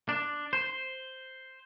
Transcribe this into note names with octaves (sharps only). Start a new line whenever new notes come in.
D4
C5